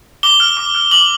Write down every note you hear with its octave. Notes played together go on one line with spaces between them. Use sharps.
D6 G7
F6
D6
F6
D6 F#7